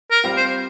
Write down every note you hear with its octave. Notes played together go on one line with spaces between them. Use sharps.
A#4
G3 C4 F4
C5